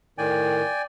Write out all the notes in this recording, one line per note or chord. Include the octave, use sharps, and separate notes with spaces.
A2 D#3 D5 G5 G#5